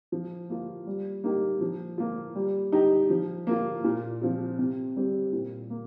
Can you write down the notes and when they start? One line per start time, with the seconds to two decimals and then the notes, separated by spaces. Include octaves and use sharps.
0.12 F3
0.50 A#3 F4
0.87 G3
1.24 A#3 D#4 G4
1.61 F3
1.98 A#3 F4
2.35 G3
2.72 D#4 G4
3.10 F3
3.47 A#3 F4
3.84 A#2
4.22 F3 C4 F4
4.59 C3
4.96 G3 C4 G4
5.33 A#2
5.70 A#3